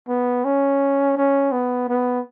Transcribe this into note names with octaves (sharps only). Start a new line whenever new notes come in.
B3
C#4
C#4
B3
B3